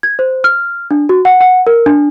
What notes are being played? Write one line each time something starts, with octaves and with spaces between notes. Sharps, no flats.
G#6
C5
F6
D4
F#4
F#5
F#5
A#4
D4